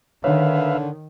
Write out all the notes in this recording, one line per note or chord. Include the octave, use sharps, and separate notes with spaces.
D3 D#3 B4 C#5 E5 F5